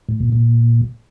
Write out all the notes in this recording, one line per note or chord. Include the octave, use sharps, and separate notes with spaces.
A2
A#2
A#2